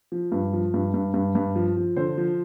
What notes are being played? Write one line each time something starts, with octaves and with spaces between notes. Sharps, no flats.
F3
G2
F3
G2
G2
G2
G2
F3
F3
D3 C5
F3